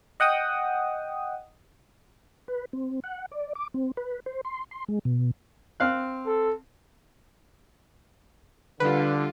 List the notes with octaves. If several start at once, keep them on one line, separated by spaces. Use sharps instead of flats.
D#5 F#5 G5 D#6
B4
C4
F#5
D5
D6
C4
B4
C5
C6
C6
G#3
B2
C4 F5 F#6
A4
D3 G3 F4 B4